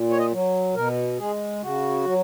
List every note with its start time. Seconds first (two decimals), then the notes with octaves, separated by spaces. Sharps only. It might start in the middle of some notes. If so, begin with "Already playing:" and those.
Already playing: A#2
0.10 C#5
0.18 D#5
0.32 F#3
0.75 B2 A#4
1.18 G#3 G#4
1.62 C#3 F#4
2.05 F#3